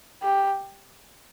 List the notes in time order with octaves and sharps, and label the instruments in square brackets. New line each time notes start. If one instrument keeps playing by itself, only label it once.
[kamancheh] G4